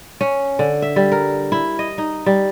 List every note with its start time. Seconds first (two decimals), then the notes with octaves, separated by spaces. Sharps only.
0.21 C#4
0.59 D3
0.82 E5
0.96 G3
1.12 A#4
1.52 E4
1.79 D#5
1.98 D#4
2.26 G3